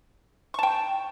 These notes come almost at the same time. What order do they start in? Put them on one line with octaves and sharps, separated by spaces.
C#6 A5 G5